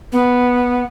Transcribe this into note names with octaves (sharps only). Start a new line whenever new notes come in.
B3